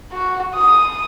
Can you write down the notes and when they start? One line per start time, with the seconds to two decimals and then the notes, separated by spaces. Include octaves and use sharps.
0.12 F#4
0.55 D#6